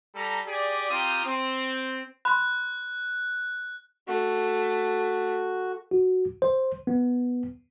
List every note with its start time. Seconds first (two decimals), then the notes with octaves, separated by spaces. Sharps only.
0.15 G3 A4 A#5
0.46 G4 G#4 D5
0.89 C4 F4 G4 A#5 D#6
1.24 C4
2.25 B5 C6 F#6
4.08 A3 F#4
5.91 F#4
6.42 C5
6.87 B3